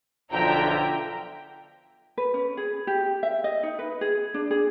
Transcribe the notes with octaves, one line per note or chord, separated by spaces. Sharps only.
B1 D3 F3 E5 G5 A#5
B4
C#4
G#4
G4
E5
D#5
D#4
B4
G#4
D4
G#4